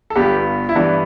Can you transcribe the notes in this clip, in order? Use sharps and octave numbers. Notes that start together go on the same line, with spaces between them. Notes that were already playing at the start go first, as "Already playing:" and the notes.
A4
G1 G2 G3 B3 G4
E4
G2 E3 B3 D4